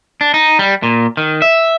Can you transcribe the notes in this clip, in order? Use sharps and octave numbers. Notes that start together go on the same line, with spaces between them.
D4
D#4
G3
A#2
D#3
E5